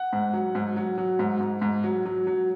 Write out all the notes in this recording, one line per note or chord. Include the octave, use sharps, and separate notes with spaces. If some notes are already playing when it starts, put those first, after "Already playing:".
Already playing: F#5
G#2
F#3
G#2
F#3
F#3
G#2
G#2
G#2
F#3
F#3
F#3